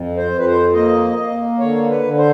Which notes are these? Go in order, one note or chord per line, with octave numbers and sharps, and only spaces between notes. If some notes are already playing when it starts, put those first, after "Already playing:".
Already playing: F2
C5
F2
B4
C5
A#3 D#5
A#3
D3 C#5
B4
D3
C5